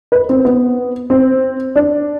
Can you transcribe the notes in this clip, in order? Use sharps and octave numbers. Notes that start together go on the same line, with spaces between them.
B4
C4
B3
C4
D4